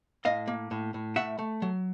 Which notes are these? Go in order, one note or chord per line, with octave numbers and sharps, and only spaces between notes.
A2 D#5 F5
A#3
A2
A2
A3 E5 F#5
A3
F#3